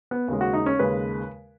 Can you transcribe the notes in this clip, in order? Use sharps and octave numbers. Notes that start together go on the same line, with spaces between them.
B3
D#2 C#3 G#3
F#4
D#4
C#4
D#2 C#3 G#3 B4